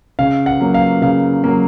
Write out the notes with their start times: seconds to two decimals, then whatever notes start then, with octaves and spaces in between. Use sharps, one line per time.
0.19 C#3 F5
0.46 F#5
0.61 F#3 A#3
0.74 F5
1.02 C#3 F5
1.44 F#3 A#3